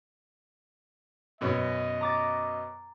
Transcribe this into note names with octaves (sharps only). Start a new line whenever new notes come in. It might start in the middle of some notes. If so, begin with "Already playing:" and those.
F#2 B2 C#4 D#5
A#5 D6 A6